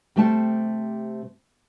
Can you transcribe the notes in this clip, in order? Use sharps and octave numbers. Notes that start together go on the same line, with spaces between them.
C3 G3 A3 C4 A5